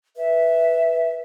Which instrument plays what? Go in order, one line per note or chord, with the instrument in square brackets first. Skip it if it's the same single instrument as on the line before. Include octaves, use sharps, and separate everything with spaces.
[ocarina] B4 [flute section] E5